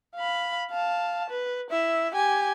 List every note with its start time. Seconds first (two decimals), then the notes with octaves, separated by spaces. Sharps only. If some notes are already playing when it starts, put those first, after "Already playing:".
0.15 F5 B5
0.71 F5 A5
1.30 B4
1.71 E4 E5
2.15 G4 G#5